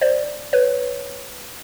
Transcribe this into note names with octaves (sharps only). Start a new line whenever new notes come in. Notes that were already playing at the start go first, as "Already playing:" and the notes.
C5 D5
B4 C#5